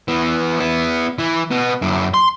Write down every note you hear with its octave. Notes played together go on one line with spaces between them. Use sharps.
E3 B3
B3 E4
E3
B2 B3
F#2 E4
C6